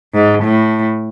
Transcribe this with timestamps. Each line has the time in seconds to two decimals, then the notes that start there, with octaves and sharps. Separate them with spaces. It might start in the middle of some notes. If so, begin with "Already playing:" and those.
0.15 G#2
0.44 A2